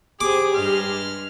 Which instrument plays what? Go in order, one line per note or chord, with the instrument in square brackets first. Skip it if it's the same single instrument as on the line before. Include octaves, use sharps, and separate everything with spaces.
[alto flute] G4 [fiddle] G#4 C5 [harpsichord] D6
[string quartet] G2 G#3 C6 [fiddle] F6